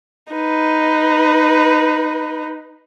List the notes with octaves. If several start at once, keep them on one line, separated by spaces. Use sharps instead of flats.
D#4 B4